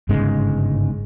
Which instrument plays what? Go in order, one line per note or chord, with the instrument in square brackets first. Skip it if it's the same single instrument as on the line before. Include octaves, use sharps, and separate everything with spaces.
[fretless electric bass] G1 G#2 C#3 G#3